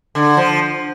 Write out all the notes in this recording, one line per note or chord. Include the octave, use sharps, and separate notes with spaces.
D3
F3